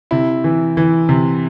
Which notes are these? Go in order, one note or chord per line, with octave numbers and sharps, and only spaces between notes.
C3 E4
E3
E3
C3